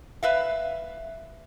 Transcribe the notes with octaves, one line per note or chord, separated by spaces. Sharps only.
B4 E5 F5